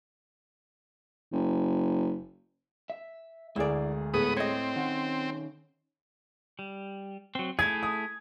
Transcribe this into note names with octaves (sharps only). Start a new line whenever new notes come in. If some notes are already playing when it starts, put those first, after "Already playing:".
F#1
E5
D2 G#3 E4 G#4 A#4 D5
A2 A3 B3 G#4 A4 D#6
C4 C#5 D#5
D#3 C#4 F#5
G3
F#3 C4
A3 E4 G#4 G#6
D#6